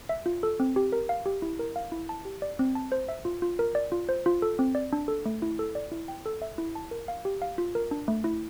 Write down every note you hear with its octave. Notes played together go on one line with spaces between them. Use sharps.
E5
F4
A4
C4
G4
A#4
F5
G4
E4
A#4
F5
E4
A5
G4
D5
C4
A5
C5
E5
F4
F4
A#4
D5
F4
C5
F4
A4
C4
D5
D4
A4
A3
E4
A4
D5
E4
G5
A4
E5
E4
A5
A#4
F5
G4
F5
F4
A#4
D4
A3
E4